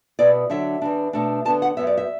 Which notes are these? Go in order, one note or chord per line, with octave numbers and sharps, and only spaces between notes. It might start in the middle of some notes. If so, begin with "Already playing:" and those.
B2 B3 E4 D5
D3 F#3 D4 E5
E2 E3 D4
B2 A3 D4
D3 B3 D4 A5
F#5
F#2 F#3 B3 E5
D5
E5